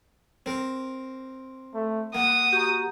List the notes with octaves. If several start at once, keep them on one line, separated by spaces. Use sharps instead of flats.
C4 A#4
A3
A#3 F#5 D#6
F#4 G4 A#5